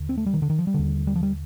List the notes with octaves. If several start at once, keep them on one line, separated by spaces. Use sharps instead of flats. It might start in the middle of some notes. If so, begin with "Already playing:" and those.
Already playing: D#2 D3
C4
A3
G3
D#3
D3
D#3
F3
G3
D#2 D3
G3
F3
G3